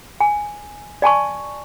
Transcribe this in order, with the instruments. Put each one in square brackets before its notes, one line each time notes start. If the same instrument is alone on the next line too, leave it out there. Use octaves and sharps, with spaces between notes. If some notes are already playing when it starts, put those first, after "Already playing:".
[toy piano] G#5
D5 G#5 A5 C#6